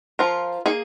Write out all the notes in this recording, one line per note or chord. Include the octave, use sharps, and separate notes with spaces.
F3 F4 A#4
A#3 D#4 G#4